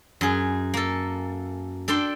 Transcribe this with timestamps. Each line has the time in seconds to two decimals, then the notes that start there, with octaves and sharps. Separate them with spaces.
0.21 F#2 G#4
0.74 A#3 A4
1.88 D4 A4 G5 C6